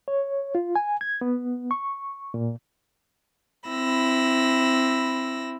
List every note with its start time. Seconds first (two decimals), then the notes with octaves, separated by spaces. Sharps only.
0.08 C#5
0.55 F4
0.76 G#5
1.01 G#6
1.21 B3
1.71 C#6
2.34 A#2
3.69 C4 E4 B5 E6 A#6